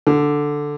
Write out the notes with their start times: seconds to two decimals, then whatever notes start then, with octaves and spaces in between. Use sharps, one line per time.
0.07 D3